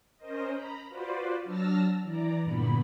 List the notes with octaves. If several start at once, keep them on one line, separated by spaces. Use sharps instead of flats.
C#4 A#4 C5 D#5
A#5 B5
F4 F#4 B4 C5 D5
F#3 D4 A5 E6 F6 A#6
E3 D5 A#5
E2 G2 A#2 D3 B3 B5